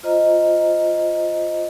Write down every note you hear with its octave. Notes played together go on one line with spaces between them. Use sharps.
F4 C5 D#5 A#5